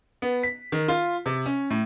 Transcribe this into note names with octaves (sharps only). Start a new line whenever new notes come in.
B3
B6
D#3
F4
C3
C#4
A2